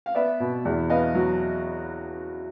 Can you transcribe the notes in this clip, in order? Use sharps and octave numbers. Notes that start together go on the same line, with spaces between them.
F5
B3 D5 E5
B2
E2
B3 D#5 F5
F#3